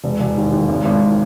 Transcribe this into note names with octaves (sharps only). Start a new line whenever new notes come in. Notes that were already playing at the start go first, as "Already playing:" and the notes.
E1
E1
D#2
D#2
G#1
G#1
D#3